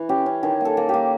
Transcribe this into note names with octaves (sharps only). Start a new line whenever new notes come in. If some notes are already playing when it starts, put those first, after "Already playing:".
Already playing: E3
C#4 G4
C#4
D#3 G#4
A#3 A4
A#3
A#3 G4